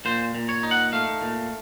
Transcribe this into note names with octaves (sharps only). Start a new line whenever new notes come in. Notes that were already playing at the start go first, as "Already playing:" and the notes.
A#2 C5
A#2
C#5
D#4
F#5
A3 F5
A#2